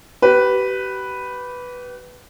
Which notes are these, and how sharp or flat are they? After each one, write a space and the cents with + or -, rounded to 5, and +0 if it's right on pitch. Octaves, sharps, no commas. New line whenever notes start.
G4 -35 B4 +0